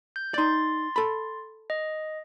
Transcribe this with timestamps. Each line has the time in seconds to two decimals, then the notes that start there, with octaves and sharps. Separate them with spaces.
0.16 G6
0.34 D#4 D5 C6 A6
0.96 A4 B5
1.70 D#5